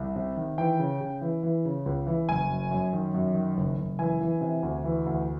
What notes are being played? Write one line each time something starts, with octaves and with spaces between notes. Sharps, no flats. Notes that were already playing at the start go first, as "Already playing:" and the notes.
Already playing: C2
C3
D#3
E3 G5
C#3
C#3
E3
E3
C#3
C#2
E3
F#1 G#5
F#2
F#2
D#3
F#2
D#3
F#1
F#1
E3 G#5
E3
C3
D2
E3
D2